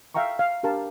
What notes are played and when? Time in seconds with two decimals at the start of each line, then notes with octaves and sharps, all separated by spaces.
0.15 E5 F5 G5 A#5 C#6
0.39 F5
0.63 D4 G4 A#4 F5 A5